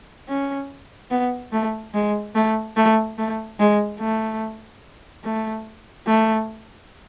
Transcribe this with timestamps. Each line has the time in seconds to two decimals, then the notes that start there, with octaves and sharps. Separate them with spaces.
0.29 C#4
1.11 B3
1.52 A3
1.94 G#3
2.35 A3
2.76 A3
3.18 A3
3.60 G#3
4.00 A3
5.24 A3
6.07 A3